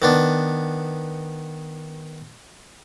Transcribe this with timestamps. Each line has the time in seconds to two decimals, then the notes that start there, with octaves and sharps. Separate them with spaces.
0.02 D#3 B3 D4